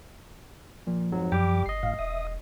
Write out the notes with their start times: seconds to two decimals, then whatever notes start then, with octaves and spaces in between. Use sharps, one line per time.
0.87 A#2 F3
1.12 F2 G#2 F#3
1.32 F#2 G3 G4 G5 D6
1.66 G1 D#5 C7
1.83 A2 F5
1.99 E1 E5 D#6